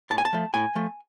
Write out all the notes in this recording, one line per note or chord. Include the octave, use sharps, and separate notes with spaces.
A2 A5
G#5
A5
F3 A3
A2 G#5
F3 A3